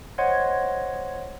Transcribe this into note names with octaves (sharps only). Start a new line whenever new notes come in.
C5 C#5 D#5 F#5 C6 G#6